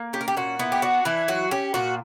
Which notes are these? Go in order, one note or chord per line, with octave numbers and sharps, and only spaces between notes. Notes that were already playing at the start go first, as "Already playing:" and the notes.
Already playing: A#3
C#4 G4
A#4
G4
A#2 F#4
B3 E4
G4
D4 F#4
E3 E4
F#3 F#4
C#4 G4
A#2 F#4